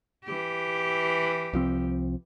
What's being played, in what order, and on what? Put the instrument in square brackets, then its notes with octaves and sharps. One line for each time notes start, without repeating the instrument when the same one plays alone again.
[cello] E3 G4
[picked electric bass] C2 F3 C4